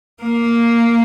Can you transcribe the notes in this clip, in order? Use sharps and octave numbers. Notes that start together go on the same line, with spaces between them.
A#3